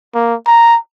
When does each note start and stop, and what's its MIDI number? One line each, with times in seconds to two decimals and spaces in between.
0.14 0.35 58
0.47 0.77 82